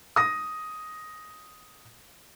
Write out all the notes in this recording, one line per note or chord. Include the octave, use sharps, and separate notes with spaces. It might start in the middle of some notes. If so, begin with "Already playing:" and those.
D#6 A#6